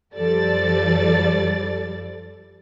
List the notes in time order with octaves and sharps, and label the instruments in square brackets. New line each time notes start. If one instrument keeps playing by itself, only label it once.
[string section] F#2 F3 G3 A4 D5 A6